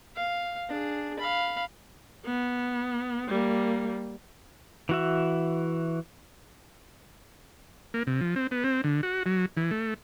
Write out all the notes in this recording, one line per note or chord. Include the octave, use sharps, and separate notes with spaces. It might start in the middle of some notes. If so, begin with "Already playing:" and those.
F5
D4 G#4
F5 B5
B3
G3 A#3
E3 F#4 E5
A#3
C3
F3
C4
B3
C4
D3
F#4
F#3
E3
A3